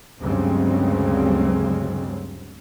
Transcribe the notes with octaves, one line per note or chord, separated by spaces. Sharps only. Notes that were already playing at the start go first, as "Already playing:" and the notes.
D2 G2 C#3 F#3 G#3 C4